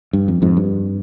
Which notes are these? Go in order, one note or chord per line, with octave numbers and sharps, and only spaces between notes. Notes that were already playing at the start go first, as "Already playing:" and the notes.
G2
F2
F2 G#2
G2